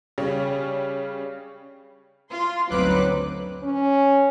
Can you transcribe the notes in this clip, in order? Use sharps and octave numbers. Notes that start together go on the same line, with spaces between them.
C#3 G3 C#4
F4 C6
G1 D2 F#3 C4 D#4 B4 D6 F#6
C#4